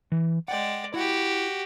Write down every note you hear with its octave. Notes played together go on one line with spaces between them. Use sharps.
E3
G#3 D5 F#5 G5
E4 F#4 G4